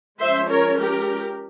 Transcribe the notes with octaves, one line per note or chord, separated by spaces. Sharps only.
F3 G#3 C#4 C5 E5
A#4 C#5
G4 A#4